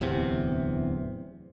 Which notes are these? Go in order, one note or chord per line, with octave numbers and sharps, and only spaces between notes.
D1 E2 C3